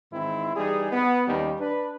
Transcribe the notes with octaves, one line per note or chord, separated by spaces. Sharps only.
G#2 D#3 E3 C4 E4
E3 G3 D#4 G#4
B3
D#2 D#3 G3 C#4 D#4
D4 B4